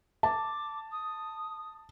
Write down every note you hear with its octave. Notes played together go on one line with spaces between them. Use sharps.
A5 D6
D#6